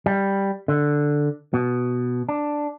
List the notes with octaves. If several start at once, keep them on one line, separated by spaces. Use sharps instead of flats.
G3
D3
B2
D4